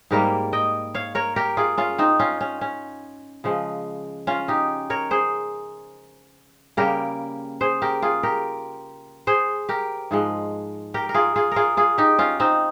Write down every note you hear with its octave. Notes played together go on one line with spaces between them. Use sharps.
G#2 G3 A#3 G4 A#4
D#5 G5
C#5 F5
A#4 C#5
G4 A#4
F4 G#4
C#4 F4
C4 D#4
C#4 F4
C#4
C#4
C#3 F3 G#3
C#4 F4
D#4 G4
A#4 C#5
G#4 C5
C#3 G3 A#3 G4 A#4
G#4 C5
G4 A#4
F4 G#4
G4 A#4
G#4 C5
G4 A#4
G#2 F3 G#3
G4 A#4
A#4
F4 G#4
F4 G#4
F4 G#4 A#4
F4 G#4
D#4 G4
C#4 F4
C4 D#4